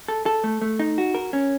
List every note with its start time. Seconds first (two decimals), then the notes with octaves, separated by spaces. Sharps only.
0.08 A4
0.26 A4
0.44 A3
0.62 A3
0.79 D#4
0.98 F#4
1.15 A#4
1.33 C#4